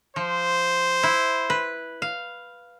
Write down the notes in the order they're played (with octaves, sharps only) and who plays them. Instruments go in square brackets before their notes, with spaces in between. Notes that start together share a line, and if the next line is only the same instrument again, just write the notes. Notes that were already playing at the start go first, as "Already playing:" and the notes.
[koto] F3 [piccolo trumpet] C5
[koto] E4
B4
F5